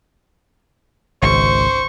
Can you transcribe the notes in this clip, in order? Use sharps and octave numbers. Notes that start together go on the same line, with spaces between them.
G#1 C#2 C5 C#6